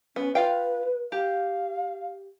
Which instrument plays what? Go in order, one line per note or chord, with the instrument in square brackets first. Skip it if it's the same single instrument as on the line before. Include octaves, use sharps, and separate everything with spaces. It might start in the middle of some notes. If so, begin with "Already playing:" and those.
[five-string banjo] B3 [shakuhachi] C#4
[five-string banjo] F4 F5 G5 [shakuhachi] B4
[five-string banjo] G4 [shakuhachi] F5